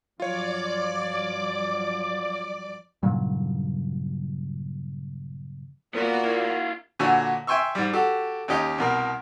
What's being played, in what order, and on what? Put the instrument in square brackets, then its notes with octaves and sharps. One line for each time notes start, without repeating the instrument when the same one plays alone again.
[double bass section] G2 F3 F#3 [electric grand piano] F4 C#5 [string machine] D5 D6
[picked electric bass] G2 A#2 C#3 F#3
[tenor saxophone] A#2 [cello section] A#3 F#4 A#4 [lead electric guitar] B3
[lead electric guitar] E4 F4
[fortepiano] A#2 D3 F#4 C#5 G#5 E6
E5 G5 G#5 C6 C#6 E6
G#2 G3
F#4 G4 A4
D#2 C#4 G4 D#5 A#5
C2 B2 A#4